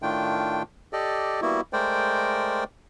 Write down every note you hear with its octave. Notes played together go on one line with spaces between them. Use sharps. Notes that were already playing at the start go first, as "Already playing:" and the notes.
A2 D#3 A3 D4 F4 G5
G4 A4 D5 D#5
G3 A#3 B3 E4 F#4
G#3 A3 A#4 C5 D5 G5